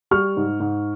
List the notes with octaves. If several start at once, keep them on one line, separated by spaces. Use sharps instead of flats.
G3 C#6 F6
G#2
G#2